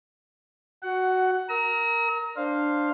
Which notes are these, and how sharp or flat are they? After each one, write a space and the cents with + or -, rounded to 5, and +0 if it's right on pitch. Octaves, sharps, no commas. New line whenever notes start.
F#4 +0 F#5 +15
A#4 +0 A#5 +0 D#6 +45
D4 +10 C5 +5 F5 +0